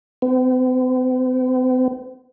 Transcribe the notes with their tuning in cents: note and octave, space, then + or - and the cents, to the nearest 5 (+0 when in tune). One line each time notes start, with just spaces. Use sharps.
C4 -45